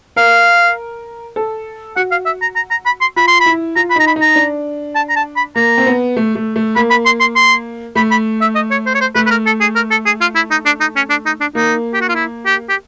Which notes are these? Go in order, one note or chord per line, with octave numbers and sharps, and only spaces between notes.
A#4 F5
A4
F#4 F#5
F5
E5
A#5
A#5
A#5
B5
C6
F4 B5
C6
B5
E4
F4 A#5
B5
D#4 A#5
B5
D#4
A#5
D4
A5
A#5
A5
B5
A#3 A#5
C4
B3
A3
A3
A3
A#3 B5
B5
C6
C6
C6
A3 B5
B5
E5
D#5
C#5
C5
C#5
C5
A3 B4
B4
A#4
A4
G#4
A#4
A4
G#4
F4
E4
D#4
D4
D#4
C#4
D4
D#4
D4
A#3 D#4
G4
F#4
F4
E4
G4
G4